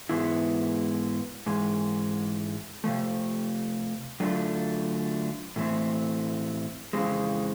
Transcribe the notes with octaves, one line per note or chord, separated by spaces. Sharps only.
G#2 E3 G#3 B3 E4
G#2 E3 G#3
C3 F3 A3
D3 F#3 A3 D4 F4
A2 E3 A3 C4
F2 C#3 E3 G#3 C4